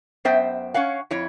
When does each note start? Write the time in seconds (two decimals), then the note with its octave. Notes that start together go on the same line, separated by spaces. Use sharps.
0.25 F#2 B3 C5 E5 G5
0.74 C#4 C#5 F5 F#5
1.11 F2 E4 C#5